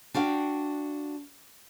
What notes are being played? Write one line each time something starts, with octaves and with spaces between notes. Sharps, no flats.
D4 F#4 F5 G5